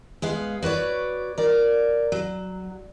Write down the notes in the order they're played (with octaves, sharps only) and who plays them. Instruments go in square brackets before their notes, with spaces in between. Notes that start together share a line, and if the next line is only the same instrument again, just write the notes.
[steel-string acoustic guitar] G#3 B3 F5
F#4 B4 C#5 D5
A#4 D5
F#3